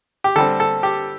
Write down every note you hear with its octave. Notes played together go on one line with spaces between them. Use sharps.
G4
D3 G3 C4 A4
A4
G4